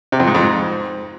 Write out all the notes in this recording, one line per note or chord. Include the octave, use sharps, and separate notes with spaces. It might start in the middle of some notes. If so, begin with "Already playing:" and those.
C3
F2
G#2
F2
G#2